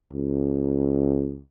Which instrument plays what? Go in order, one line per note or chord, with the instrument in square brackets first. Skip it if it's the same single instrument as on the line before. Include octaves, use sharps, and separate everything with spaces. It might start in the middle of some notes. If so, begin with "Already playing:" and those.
[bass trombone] C#2